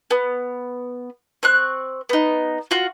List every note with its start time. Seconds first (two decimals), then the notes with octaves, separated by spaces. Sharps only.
0.11 B3
1.43 C4 C#6 F#6
2.09 B3 D#4
2.71 F4 F#4